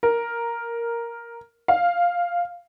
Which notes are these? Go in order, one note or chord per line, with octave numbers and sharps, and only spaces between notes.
A#4
F5